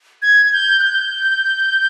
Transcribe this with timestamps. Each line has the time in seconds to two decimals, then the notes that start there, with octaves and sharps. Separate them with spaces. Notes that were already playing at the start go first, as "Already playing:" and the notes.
0.22 G#6
0.46 G#6
0.53 G6
0.80 F#6
0.83 G6